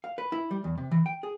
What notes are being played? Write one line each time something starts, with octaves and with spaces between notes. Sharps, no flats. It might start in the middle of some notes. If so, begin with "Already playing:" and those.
F5
B4
E4
G3
E2
C3
E3
G5
G#4